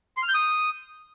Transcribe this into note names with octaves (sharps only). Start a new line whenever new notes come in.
C6
F6
G6
D#6